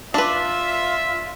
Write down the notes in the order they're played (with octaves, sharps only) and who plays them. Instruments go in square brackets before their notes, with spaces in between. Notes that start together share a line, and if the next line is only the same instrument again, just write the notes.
[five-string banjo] D4 B4 [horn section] F4 [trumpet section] E5